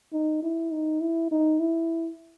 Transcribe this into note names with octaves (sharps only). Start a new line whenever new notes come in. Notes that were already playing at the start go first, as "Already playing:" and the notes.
D#4
E4
D#4
E4
D#4
E4